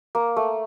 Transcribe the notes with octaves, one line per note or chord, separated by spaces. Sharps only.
A#3
A3